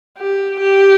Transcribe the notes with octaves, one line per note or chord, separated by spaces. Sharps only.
G4
G4